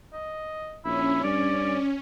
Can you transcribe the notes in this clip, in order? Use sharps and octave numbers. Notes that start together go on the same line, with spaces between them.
D#5
A#1 C#4 E4
G2 D5